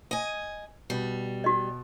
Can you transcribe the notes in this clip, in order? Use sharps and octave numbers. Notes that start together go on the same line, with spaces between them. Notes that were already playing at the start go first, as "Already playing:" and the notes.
D#5 G#5
B2 G3
F#4 D#5